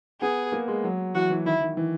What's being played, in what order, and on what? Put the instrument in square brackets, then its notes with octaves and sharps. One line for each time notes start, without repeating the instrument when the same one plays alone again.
[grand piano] B3 [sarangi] G#4
[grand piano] A#3
G#3
F#3
[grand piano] E3 [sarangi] F#4
[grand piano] E3
[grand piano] D#3 [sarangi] E4
[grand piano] D#3
E3